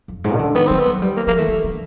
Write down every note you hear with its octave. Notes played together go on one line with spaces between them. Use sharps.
F2
G#2
D#3
D3
D#3 B3
G3 C4
B3
F#3
G3
A#3
F3 A#3
E3 A3
D#3
D3